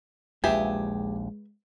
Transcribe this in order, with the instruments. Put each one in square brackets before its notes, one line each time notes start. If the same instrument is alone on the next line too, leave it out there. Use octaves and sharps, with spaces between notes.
[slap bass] A#1 D#2 [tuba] G#3 [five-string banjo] G4 G#4 [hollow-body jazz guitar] B4 E5